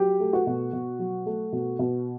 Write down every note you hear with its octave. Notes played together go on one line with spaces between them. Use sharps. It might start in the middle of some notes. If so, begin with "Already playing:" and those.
Already playing: F#3 G4
A3
F#4
B2
B2
F#3
A3
B2
B2